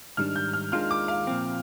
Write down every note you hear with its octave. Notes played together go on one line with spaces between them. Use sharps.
G#2 D#3 G3 D4 F6
G6
F6
D#2 D#3 G#3 D4 F4 F6
D6
F5
A#2 F3 C4